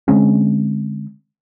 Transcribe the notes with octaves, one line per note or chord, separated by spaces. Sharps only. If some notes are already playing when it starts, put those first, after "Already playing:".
D3 G#3 C4 C#4